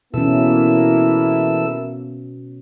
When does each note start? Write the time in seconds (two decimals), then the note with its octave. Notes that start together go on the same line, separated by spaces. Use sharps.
0.14 B2 E3 A#3 C#4 E4 A4 E6